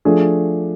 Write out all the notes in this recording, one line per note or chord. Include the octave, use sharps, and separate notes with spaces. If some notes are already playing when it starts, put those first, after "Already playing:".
F3 A3 D4 G#4